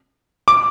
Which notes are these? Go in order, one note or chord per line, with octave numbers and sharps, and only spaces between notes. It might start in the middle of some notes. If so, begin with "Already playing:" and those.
D6